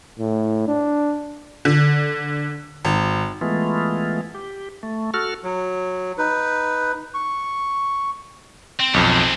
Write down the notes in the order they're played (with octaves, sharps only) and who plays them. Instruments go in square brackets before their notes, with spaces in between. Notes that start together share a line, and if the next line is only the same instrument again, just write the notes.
[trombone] A2
D4
[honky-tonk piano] D3
G#1
[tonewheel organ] E3 G#3 A3 B3 F4
G4
A3
F#4 A4 F6
[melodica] F#3
D#4 B4
C#6
[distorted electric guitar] C4
[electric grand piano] B1 F2 [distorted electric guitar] A4 C#5
[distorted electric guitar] C4 G#4